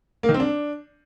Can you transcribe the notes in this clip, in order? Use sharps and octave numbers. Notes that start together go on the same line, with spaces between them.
A#3
D#3
C4
D4